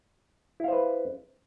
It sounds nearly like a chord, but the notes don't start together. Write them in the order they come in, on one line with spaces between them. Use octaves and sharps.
E4 F5 C5 B4